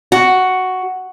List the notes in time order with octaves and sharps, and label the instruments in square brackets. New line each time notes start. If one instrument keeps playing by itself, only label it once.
[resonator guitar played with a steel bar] F#4